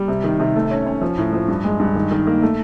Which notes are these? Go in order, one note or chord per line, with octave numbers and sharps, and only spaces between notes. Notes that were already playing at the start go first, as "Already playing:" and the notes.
Already playing: G3
C3
D#3
C3
A3
C#4
C#4
F3
A2
F3
G2
G#3
G2
D#3
D#3
A#3
A3